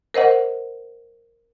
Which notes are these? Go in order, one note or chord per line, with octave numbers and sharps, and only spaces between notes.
A#4 C5 D#5 F#5